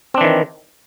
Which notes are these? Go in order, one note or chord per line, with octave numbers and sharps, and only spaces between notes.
D#3 E3 C4 D4